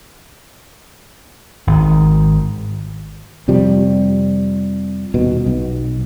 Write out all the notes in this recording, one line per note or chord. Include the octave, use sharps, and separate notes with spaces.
G#1 D#3
F2 C3 F3 G3
D#1 B2
B1